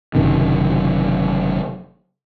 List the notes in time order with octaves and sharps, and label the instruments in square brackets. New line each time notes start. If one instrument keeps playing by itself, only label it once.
[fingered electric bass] F#1 F#2 C3 D#3